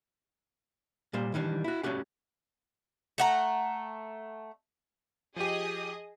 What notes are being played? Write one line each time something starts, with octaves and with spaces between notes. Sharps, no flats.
A#2 G3 C5
D#3 E3 G3 D4
E4 F#4
A3 C#4 F#4 G4 F#5
A3 F#5 A#5
F3 G4 G#4 D#5 D#6